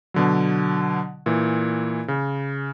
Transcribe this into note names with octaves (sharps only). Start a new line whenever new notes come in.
B2 D3 F#3
A#2 E3
C#3